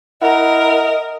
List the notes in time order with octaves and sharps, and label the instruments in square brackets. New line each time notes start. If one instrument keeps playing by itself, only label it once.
[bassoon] E4 [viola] A#4 [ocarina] D#5 [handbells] F#5 A#5